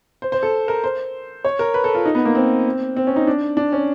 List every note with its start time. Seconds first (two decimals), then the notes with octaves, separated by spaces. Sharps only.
0.22 C5
0.32 C5
0.43 A4
0.68 A#4
0.84 C5
1.44 C#5
1.59 A#4
1.74 B4
1.84 A4
1.94 F4
2.05 D#4
2.15 B3
2.25 A#3
2.35 C4
2.97 C4
3.07 C#4
3.16 D#4
3.27 D4
3.57 D4
3.72 C#4